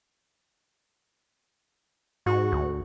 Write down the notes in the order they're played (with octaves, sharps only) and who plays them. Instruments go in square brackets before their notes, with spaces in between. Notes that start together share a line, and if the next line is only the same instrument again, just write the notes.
[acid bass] G#2 [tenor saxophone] F#4
[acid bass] D2